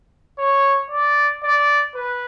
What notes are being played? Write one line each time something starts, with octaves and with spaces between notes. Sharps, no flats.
C#5
D5
D5
B4